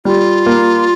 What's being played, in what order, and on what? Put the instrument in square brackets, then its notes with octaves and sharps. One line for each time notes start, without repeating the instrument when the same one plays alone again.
[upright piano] G3 [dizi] F4
[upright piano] A#3